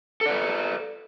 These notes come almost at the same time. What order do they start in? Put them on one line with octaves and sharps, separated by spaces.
A4 D5 B4